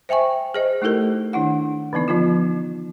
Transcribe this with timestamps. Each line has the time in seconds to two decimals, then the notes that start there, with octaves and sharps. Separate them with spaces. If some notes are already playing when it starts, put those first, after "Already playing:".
0.09 C5 E5 G5 G#5 C#6
0.54 G#4 C5 D#5
0.82 A3 D#4 E4 G4 A4 A#4
1.33 D#3 D4 E4 F#5
1.93 D3 E3 B3 D#4
2.08 F3 B3 D#4 F4